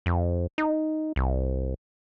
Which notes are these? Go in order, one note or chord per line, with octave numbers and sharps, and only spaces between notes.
F2
D#4
C2